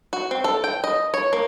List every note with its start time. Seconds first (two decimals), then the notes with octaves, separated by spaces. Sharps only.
0.13 F#4
0.31 C4
0.44 A4
0.64 G5
0.84 D#5
1.14 C#5
1.33 A#3